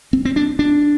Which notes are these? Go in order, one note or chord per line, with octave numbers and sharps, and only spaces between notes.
C4
C4
D4
D4